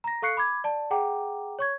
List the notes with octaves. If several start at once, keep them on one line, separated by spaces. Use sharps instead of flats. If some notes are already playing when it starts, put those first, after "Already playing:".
A#5 A#6
A4 F5 C#6 F#6 C7 C#7
B5 D6 G#6
D5 A5
G#4 F#5 G5 A#5 D6
C#5 C#6 G#6